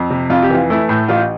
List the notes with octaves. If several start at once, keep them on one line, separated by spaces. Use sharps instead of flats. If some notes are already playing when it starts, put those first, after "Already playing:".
Already playing: F2
C3
F2 F4
G4
E3 F4
A3 E4
A2
A1 F4